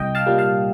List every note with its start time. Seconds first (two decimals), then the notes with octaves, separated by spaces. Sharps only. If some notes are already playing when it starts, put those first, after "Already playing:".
Already playing: C2 D#5 G5
0.15 F5 A5
0.26 A#2 G3 A#3
0.38 F5 A5